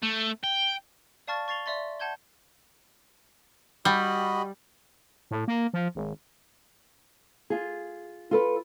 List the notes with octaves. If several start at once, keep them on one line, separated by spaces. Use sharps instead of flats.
A3
G5
D5 F5 A5 C#6 F6 A6
C#6 A6 C7 F7 G7
D5 E5 C6 A6
F#5 A5 G6 G#6 G7
G3 F#4 D#5 B5
A2
A#3
F3
G#1
F4 G#4
F4 A4 B4